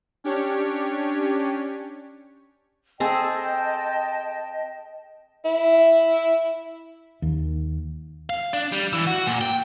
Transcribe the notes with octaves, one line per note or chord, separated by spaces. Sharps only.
C#4 D4 G4 C#5
C4 G#4 A4 D#5 G5 A5
E4
D#2
F5
D4
G3
E3
F#4
A#2
G5